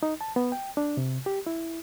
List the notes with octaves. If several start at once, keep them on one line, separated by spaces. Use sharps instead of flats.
D#4
A5
B3
G5
D4
C3
G4
E4